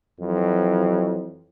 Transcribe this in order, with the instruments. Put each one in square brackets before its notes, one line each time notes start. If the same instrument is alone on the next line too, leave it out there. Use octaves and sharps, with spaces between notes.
[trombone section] F2 E3 F#3